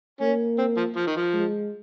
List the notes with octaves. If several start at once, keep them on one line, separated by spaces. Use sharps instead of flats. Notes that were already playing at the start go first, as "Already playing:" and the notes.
A#3 C#4
C4
F3
F3
D#3
F3
G#3